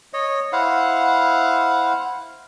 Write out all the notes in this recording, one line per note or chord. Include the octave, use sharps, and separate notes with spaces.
C#5 D#5
E4 C5 F5 F#5